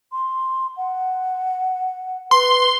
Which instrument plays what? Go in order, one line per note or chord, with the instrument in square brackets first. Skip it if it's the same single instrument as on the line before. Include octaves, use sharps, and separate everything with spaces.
[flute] C6
F#5
[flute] B4 [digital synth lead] C6